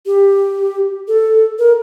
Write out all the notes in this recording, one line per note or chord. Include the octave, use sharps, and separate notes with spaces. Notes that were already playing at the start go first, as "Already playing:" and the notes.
G4
A4
A#4